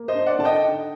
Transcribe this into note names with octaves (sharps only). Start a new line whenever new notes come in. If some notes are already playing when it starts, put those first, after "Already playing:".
Already playing: A#3
C5 D#5
D4
D5 F#5
D3 A5
D#5 G5
D#4